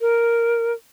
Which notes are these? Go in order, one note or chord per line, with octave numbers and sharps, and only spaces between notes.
A#4